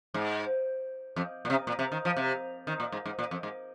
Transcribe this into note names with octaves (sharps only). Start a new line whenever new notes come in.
G#2
F2
A#2
C3
A#2
C3
D#3
F3
C3
D#3
A#2
G#2
G#2
A#2
F2
G#2